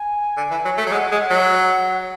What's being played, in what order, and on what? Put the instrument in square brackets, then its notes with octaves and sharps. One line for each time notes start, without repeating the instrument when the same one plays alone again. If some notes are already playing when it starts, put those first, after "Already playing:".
Already playing: [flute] G#5
[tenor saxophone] D3
E3
F#3
A3
F#3
[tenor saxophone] G#3 [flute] F#5
[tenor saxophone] G#3
[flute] F#5
[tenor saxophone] F#3